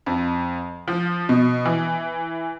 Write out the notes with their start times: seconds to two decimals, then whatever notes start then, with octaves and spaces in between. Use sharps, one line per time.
0.06 F2
0.88 F3
1.29 B2
1.65 E3